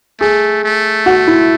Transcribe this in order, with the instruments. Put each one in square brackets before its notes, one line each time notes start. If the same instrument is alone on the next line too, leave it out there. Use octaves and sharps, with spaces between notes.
[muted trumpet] A3 [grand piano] G#4
[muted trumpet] A3
[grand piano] F#4
E4